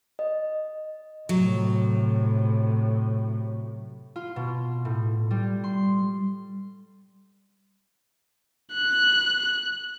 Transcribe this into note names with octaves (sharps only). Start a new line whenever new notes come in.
D#5
A2 C3 F#3
F4
B2
A2
G3
C6
F#6